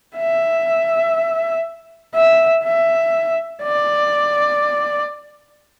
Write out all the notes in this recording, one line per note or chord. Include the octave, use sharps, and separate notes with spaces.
E5
E5
E5
D5